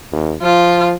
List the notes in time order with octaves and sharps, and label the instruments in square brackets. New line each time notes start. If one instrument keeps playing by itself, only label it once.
[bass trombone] D#2
[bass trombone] F3 [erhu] F4